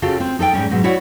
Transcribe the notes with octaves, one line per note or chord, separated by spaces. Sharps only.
C#3 C4 F4 F#4 A4
C4 F4
D#4 A4 D#5 G5
G#2 C#3 G3 C#4
G#2 B2 F#3
E4 F#4 C#5 D5 F#5